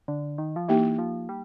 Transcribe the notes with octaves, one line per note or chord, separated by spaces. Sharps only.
D3
D#3
F3
E3 A#3 D#4 G4
F3
G3